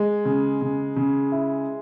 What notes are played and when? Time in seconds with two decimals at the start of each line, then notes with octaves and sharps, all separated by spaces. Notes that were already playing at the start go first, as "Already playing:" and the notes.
Already playing: G#3
0.25 C#3
0.61 C#3
0.96 C#3
1.32 E4